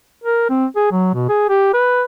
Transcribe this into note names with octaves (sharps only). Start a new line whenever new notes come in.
A#4
C4
G#4
F#3
B2
G#4
G4
B4